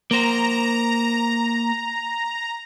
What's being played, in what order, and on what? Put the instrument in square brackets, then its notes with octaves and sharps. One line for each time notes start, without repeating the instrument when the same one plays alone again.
[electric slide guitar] A#3 C5 [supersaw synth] A#5